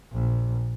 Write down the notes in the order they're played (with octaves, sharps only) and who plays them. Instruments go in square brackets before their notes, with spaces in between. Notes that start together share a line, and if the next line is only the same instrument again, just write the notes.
[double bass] A#1